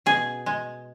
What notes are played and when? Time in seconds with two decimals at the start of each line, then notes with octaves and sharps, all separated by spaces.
0.06 B2 G#4
0.46 G#3